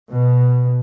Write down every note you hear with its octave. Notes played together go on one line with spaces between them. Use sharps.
B2